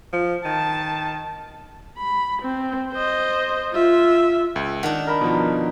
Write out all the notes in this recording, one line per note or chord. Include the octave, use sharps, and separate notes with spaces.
F3
D#3 A5
B5
C4
C5 D#5
F4 E5
C#2
D#3 D4 F#5
A#4 B5
B2 F3